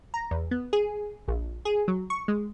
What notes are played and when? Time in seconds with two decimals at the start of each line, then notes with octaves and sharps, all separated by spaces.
0.14 A#5
0.31 E2
0.51 B3
0.73 G#4
1.28 A#1
1.65 G#4
1.88 F#3
2.10 C#6
2.28 G#3